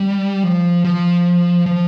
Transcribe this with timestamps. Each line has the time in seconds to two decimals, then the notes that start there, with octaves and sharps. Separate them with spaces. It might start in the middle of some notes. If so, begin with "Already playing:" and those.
Already playing: G3
0.43 F3
0.85 F3
1.66 F3